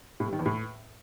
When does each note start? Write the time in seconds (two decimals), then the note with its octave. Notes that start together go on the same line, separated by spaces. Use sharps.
0.20 A2
0.26 G2
0.33 D#3
0.39 E2
0.46 A2